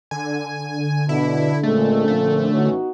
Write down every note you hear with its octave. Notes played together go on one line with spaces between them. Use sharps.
D3 G#5
B2 D4 E4
A#2 G#3 A3 C4 C#4 A4
A#2 F3 A3
A1 E3 B3 C#4 D#4 F#4